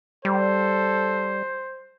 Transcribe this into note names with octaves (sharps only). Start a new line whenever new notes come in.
G3 A4 C5